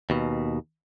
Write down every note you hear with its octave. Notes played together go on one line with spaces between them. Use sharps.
D#2 B2